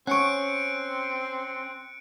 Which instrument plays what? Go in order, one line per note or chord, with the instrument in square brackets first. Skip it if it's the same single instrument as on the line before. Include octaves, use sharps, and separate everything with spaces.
[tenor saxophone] C4 [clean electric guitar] C#4 [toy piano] F#5 C#6 [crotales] F#6 C#7 D7